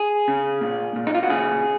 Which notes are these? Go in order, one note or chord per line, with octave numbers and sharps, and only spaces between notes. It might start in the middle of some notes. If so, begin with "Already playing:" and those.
Already playing: G#4
C#3
A#2
A#2
D#4
F4
F#4
C#3 G#4